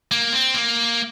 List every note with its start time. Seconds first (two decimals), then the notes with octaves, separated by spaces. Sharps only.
0.11 A#3
0.33 C4
0.54 A#3